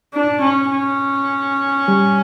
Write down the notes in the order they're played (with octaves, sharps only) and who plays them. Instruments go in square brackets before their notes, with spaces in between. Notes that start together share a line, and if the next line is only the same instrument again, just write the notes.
[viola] D4
C#4
C#4
[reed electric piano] G3